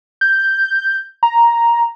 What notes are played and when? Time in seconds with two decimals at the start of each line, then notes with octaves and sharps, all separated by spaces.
0.21 G6
1.23 A#5